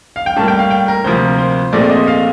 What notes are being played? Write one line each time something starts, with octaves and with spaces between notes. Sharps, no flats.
F5
G5
A2 G3 A#3 A5
G5
F5
G5
A#4
D2 C3 F3 A#3 C5
A#4
C5
A#1 A#2 A3 C4 D5
D5
D#5
F5